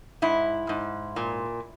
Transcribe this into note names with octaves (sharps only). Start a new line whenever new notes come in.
G#2 E4
G#2
A#2